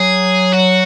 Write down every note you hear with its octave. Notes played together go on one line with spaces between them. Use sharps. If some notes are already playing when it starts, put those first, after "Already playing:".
Already playing: F#3 G#4
F#4